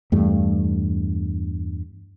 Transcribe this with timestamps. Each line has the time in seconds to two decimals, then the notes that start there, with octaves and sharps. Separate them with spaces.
0.12 E2 G2 A3